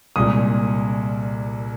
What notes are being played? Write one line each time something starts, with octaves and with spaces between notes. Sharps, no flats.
C2 A#2 G#3 D#6